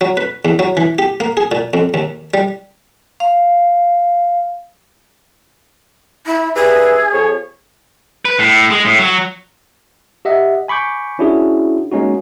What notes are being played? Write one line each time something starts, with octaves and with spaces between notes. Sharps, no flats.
F#3
B4
E2
F#3
E3
G4
A#3
G#4
A#2
F2
D#2
G3
F5
E4
G2 G#4 B4 E5
F2 C#5
B4
A2
G#3
A2
F#3
G4 D#5 E5 F#5
G#5 B5 C#6 D6 G6
C#4 D4 E4 F#4 G#4
G#3 A#3 C#4 D#4 F#4